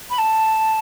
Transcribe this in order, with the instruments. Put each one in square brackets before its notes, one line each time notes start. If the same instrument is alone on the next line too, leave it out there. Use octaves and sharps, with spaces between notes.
[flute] B5
A5